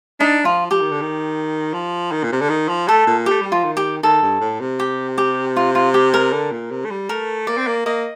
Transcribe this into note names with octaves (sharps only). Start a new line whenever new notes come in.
D4 D#4
F3 F4
F3 G4
D#3
D3
D#3
F3
D#3
A#2
C3
D3
D#3
F3
A3 A4
A#2
A3 G4
G3
F3 F4
D#3
G4
D#3 A4
G2
A2
C3
G4
G4
F4
F4
G4
A#4
D3
A#2
C3
A3
G3
A3 A#4
A#3 D5
C4
A#3
A#3 D#5